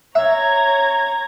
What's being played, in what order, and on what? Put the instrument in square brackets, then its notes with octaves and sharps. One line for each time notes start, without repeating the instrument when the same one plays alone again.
[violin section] C#5 A#5 G#6 [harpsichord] E5